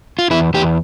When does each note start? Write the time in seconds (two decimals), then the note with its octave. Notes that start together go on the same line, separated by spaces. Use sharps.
0.19 F4
0.30 E2 E4
0.54 E2 G4